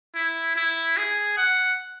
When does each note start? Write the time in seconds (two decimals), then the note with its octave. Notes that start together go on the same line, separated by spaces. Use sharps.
0.15 E4
0.56 E4
0.97 G#4
1.37 F#5